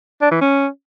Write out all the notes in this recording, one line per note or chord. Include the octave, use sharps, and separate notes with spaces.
D4
E3
C#4